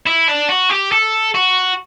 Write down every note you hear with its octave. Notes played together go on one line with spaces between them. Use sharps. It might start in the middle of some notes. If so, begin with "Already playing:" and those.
E4
D4
F#4
G4
A4
F#4